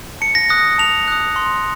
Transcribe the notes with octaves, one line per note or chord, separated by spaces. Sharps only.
A5 C#7
A#6
D#6 F#6 A#6
A5 F7
D#6 F#6
C6